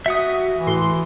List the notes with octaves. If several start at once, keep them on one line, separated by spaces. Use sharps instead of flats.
F#4 E5 F#5 D#6
E3
A2 C6